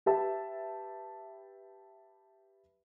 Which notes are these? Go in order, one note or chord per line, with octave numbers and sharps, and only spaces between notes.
G4 B4 E5 A5